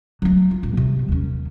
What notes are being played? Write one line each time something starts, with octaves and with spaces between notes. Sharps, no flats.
F#3 A3
F4
D#1
C3 G3
D#2 C#4